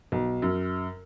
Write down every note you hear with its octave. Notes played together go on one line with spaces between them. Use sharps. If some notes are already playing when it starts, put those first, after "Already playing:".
B1
F#2